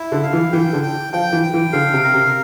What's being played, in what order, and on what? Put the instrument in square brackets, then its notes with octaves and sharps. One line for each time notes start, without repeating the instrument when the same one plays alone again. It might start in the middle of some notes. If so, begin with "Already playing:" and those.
Already playing: [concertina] E4
[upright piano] D3
[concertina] F5
[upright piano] E3
[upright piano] E3 [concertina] G5
[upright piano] D3
[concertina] G5
[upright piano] F3 [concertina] G5
[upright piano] E3
[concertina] G5
[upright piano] E3
[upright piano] D3 [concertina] F5
[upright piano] C3
[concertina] A#4
[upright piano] C3